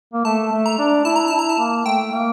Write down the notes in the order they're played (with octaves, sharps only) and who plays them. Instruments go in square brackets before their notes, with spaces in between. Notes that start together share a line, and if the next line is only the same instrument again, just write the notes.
[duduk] A#3
[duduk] A3 [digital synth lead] A5
[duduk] A3
[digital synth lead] A#5
[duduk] D4
[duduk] E4 [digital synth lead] A5
[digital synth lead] A#5
[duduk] E4 [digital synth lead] A5
[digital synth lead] A#5
A5
[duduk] A#3
[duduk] A3 [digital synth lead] G5
[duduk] A#3